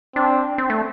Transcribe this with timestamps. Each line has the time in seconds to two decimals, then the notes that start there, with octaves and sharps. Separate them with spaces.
0.16 C4 D4
0.58 C4
0.70 A3